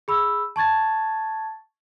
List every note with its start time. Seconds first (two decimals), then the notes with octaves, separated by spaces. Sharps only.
0.08 G#4 B5 E6
0.56 A5 C#6 G#6 A6